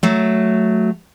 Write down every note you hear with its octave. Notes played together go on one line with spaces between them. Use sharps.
F#3 A3